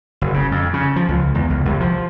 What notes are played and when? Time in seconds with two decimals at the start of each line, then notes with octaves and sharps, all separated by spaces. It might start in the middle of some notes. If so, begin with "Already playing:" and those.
0.21 F#1
0.34 C#3
0.51 F2
0.74 C#3
0.96 F3
1.08 C#2
1.35 E2
1.50 C#2
1.65 C2
1.80 F3